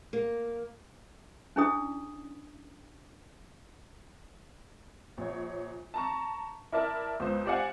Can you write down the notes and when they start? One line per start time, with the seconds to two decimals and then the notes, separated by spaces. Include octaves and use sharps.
0.13 A#3
1.56 C#4 D4 E4 G#4 D5 D#6
5.18 A#1 C#5
5.94 A5 A#5 C#6
6.72 E4 A#4 D5 A5
7.20 C#2 B3 C5
7.45 G4 C5 D5 F5 F#5 G#5